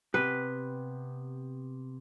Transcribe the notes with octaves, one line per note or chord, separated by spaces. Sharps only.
C3 B3 G4 B4